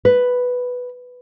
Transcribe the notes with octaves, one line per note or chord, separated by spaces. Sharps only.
B4